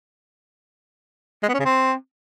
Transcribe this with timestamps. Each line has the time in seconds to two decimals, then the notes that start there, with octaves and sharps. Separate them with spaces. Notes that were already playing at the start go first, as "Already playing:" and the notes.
1.43 G#3
1.49 B3
1.54 C#4
1.60 C#3
1.65 C4